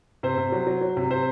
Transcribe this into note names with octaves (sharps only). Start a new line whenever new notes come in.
C3 C5
C3
F#3
F#3
F#3
C3
C3 C5